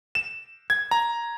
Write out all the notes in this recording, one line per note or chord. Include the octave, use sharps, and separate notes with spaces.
E7
G#6
A#5